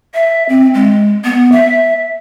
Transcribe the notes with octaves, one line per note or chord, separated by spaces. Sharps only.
E5
C4
G#3
B3
E5